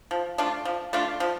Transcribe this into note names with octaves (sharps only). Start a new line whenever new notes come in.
F3
A3 D4 F4
F3
A3 D4 F4
F3